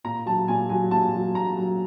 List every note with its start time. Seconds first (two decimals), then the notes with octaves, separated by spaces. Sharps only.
0.04 A#2 A#5
0.26 F#3 A5
0.48 A#2 G#5
0.69 F#3 G#5
0.91 A#2 A5
1.14 F#3
1.35 A#2 A#5
1.56 F#3